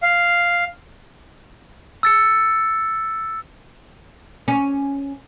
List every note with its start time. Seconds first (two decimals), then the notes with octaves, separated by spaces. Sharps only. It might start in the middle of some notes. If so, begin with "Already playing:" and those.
0.03 F5
2.03 E6 A6 C#7
4.48 C#4